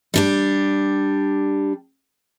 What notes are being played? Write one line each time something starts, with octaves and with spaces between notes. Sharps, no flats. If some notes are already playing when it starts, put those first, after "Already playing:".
G3 D4 G4